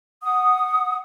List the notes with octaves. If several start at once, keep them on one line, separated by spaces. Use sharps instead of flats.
F#5 D#6